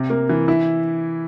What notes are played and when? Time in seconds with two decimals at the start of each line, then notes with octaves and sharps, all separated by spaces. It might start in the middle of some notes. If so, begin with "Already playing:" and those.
Already playing: C3
0.10 A#3
0.29 E3
0.48 E4